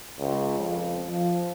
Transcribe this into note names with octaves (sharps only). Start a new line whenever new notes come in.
C#2
F2
F3